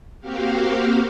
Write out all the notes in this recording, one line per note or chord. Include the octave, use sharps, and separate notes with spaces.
A#3 C4 F#4 G4 F5